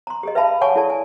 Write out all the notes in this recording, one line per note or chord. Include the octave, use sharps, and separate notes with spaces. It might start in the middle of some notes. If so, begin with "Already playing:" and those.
A#5 C6
G4 G#4 D#5
B4 E5 F5 A5 B5
C#5 F#5 G#5 A5 C#6 D6
E4 G#4 A4 D5 A5
G#5